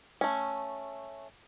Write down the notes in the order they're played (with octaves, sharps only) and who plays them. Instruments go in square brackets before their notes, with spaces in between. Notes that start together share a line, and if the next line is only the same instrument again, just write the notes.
[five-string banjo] A3 C#4